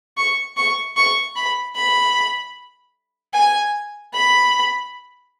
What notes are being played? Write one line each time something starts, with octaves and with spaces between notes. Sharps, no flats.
C#6
C#6
C#6
B5
B5
G#5
B5